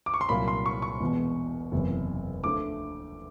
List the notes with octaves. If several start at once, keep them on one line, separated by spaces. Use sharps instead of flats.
D6
C#6
C6
C2 A#2 F#3 A#3 B5
C6
C#6
C#6
E1 E2 B2
F#1 E2 C3 E3
D2 D3 F3 A3 D6